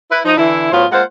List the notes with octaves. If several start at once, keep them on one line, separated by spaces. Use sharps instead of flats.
E4 B4
F3 D#4
D3 E3 E4
A2 F#3 B3 F4 C5
G#3 A#3 F4 C5 F#5